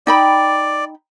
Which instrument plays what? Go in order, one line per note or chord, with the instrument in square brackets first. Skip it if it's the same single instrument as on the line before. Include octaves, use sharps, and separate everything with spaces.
[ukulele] D#4 G5 B5 [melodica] D5